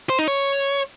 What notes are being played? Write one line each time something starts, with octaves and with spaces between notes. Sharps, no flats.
C5
D#4
C#5